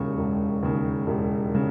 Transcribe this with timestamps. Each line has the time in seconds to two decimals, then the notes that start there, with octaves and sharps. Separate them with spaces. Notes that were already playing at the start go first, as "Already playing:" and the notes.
Already playing: E1 D#2 C#3 C#6
0.18 E1
0.63 D#2 C#3
1.07 E1
1.55 C#3